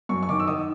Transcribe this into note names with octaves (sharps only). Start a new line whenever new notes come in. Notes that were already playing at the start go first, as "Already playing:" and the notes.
F#2 C#6
C#6
D#3 D6
E6
D#3 D#6